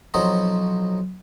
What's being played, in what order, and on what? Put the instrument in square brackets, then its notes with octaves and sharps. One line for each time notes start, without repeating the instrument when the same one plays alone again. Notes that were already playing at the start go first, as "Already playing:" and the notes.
[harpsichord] B1 F3 F#3 C4 D#4 D#5